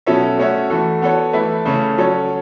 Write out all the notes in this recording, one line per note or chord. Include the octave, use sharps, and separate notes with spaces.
B2 F#3 C#4 A4 E5
A3 C#4 F#4 C#5 E5
E3 A3 F#4 A4
B3 F#4 A4 C#5
E3 A3 E4 B4
C#3 A3 C#4
F#3 C#4 A4 C#5